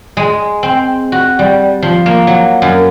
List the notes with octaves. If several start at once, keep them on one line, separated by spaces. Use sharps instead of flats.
G#3
C4
F#4
G3
F3
A#3
F#3
F#2